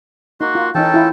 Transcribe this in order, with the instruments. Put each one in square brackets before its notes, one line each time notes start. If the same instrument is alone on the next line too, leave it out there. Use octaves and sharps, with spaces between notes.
[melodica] A#3 C6 [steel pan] D#4 [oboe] F#4
[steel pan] F4
[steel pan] E3 D#4 [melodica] C#4 A4 A5 [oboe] G5
[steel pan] E4 F4